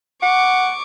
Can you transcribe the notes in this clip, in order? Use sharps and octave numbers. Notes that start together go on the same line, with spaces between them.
F#5 C#6 D6